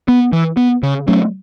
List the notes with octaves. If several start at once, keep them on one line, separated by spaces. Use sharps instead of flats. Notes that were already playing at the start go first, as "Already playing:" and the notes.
B3
E3
B3
C#3
F#3 A3 C#4